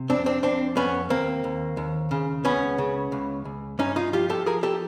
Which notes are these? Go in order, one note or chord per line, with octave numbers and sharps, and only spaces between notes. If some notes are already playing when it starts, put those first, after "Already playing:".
Already playing: C3
F2 C4 D4
C4 D4
F2 C4 D4
F2 B3 C#4
D#2 A#3 C4
D#2
D#2
C#3
C#2 B3 C#4
C#3
C#2
C#2
G2 C#4 D#4
D#4 F4
F3 F4 G4
G4 A4
F3 G#4 A#4
G4 A4